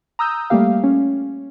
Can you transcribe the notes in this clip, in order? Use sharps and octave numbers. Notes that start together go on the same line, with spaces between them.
A#5 D#6 E6 G6
G3 A3 A#3 G4 F5
C#4